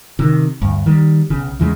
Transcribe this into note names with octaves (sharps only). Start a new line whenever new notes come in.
C3 D#3
D2 G2
D#3 G3
B1 C#3
E2 C#3 F#3 G#3